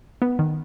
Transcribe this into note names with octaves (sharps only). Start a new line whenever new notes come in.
B3
D#3